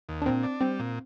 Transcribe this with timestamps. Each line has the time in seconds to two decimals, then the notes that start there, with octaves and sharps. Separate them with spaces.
0.09 D#2
0.22 D4
0.26 A#2 C4
0.43 D4
0.61 G3 C4
0.79 A#2